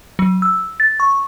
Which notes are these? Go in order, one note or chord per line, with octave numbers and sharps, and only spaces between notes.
F#3
E6
A6
C#6